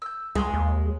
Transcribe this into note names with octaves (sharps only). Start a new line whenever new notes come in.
E6 G6
C#2 G#3 G#5 C6
D#2